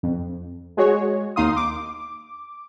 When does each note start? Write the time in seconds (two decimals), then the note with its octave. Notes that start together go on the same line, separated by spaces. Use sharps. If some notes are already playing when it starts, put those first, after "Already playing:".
0.03 F2
0.77 G#3 F#4 C#5
1.36 D#2 D#4 F5 C6 D#6
1.56 D6